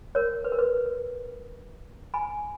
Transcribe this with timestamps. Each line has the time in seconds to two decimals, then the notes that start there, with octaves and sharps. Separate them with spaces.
0.15 A#4 C#5
0.44 B4
0.52 A#4
0.59 B4
2.14 G#5 B5